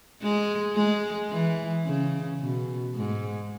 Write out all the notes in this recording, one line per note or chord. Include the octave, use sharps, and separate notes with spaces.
G#3
G#3
E3
C#3
B2
G#2